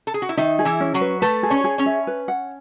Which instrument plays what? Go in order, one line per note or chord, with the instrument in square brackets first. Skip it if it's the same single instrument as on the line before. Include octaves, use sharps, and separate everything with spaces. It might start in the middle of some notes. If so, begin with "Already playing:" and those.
[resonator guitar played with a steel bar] A4
G#4
F#4
E4
[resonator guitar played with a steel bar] D#3 D#4 [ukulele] E5
[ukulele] G#4
[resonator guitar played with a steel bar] E3 E4
[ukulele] C#4
[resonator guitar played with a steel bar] F#3 F#4
[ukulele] B4
[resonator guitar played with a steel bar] A3 A4 [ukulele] B4
[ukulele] G#4
[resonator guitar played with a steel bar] C#4 C#5
[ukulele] G#4
[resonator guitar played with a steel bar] C#4 C#5
[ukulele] E5
B4
F#5